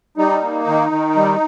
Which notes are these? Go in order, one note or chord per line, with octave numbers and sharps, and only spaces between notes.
G3 D#4
A#3
D#3
D#3
G3